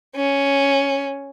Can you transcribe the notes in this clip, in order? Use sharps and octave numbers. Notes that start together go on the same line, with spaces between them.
C#4